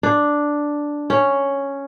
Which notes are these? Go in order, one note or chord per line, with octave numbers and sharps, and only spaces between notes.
D4
C#4